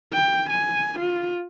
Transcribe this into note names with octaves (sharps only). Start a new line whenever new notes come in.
G5
G#5
F4